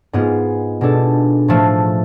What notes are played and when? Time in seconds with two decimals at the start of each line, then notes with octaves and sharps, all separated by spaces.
0.13 G#2 G#3 B3 F4
0.81 B2 G#3 D4 A4
1.48 A2 F3 A3